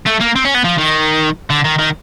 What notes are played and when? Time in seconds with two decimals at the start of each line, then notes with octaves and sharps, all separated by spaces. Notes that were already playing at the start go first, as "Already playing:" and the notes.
0.06 A3
0.21 A#3
0.36 C4
0.45 C#4
0.54 B3
0.64 F3
0.78 D#3
1.50 D3
1.65 D#3
1.79 D#3